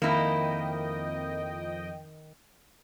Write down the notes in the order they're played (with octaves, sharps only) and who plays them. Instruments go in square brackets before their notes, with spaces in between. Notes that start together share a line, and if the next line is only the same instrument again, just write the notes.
[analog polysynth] F2 D#5 G5 [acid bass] D#3 [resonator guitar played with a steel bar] A#3 E4